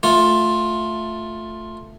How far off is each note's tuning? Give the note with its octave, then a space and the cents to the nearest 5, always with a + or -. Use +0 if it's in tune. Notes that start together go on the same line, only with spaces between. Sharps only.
A3 +5 F4 +10